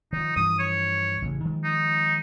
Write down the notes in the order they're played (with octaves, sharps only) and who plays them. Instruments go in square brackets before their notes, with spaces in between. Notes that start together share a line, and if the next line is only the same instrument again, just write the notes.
[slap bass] D#3 F3 [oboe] D#4
[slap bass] G2 E3 F3 [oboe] D#6
[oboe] C#5
[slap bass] A1 C#3
D#3 F3 G#3
[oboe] D#4